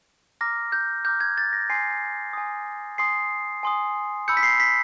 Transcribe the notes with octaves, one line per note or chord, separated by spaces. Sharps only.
A#5 D6 F6 A#6
G6
A#5 D6 F6 G6
G#6
A6
A#6
G#5 C6 D#6 C7
G#5 C6 D#6
G#5 C6 D#6 C7
G#5 C6 D#6
B5 E6 G6 C#7
B6
C7
B6